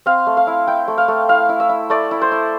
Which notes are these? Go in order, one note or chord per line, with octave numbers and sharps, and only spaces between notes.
C4 F5
A3
F5
E4
E4 G5
A3
F5
A3
E4 F5
E4
E5
E4
A3 D5
E4
C5
E4